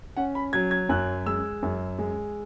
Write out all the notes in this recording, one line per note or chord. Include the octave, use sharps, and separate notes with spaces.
C#4 F#5
B5
F#3 G#6
G#6
F#2 F#6
G#3 E6
F#2
G#3